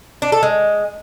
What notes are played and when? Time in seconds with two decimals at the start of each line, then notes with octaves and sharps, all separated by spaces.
0.22 D4
0.32 A4
0.43 G#3